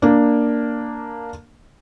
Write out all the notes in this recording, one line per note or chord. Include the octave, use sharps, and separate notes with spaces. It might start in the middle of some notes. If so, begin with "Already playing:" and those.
A#3 D4